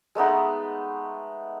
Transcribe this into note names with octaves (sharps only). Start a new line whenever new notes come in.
G#3 A3 B3 D#4